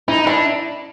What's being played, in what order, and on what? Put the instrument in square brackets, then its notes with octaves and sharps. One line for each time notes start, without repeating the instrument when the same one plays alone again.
[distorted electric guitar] D#4 [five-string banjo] E4
[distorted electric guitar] D4 [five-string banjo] E4